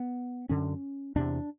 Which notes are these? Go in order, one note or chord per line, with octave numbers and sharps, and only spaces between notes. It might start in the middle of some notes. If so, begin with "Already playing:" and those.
Already playing: B3
F#2 D3 C#4
E2 C3 D4